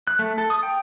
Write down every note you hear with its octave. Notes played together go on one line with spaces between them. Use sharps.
F#6
A3
A4
D#6
G5